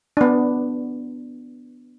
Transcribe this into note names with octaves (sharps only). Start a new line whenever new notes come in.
B3 D4